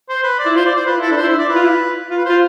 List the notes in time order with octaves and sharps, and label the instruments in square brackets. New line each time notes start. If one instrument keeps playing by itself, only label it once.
[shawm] C5
B4
D5
[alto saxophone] E4
[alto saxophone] F4 [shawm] C5
[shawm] D5
C5
[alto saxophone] F4 [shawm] B4
[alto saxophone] E4 [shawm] A4
[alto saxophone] D4 [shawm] B4
[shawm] C5
[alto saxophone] E4
[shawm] E5
D5
[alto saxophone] E4 [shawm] B4
[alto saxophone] F4
E4
F4
[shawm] B4
[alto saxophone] F4 [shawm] C5